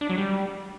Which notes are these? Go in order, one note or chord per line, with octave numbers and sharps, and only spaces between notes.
D4
F#3
G3